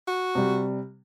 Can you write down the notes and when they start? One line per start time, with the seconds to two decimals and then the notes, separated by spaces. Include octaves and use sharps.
0.08 F#4
0.35 C3 G3